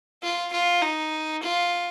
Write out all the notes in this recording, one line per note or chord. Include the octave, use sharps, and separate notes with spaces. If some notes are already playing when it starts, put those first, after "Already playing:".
F4
F4
D#4
F4